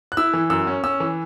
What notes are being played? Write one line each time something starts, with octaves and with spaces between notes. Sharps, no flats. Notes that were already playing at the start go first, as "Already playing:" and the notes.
F#6
E4 E6
E3
F#2 E6
C#4
C#4 E6
E3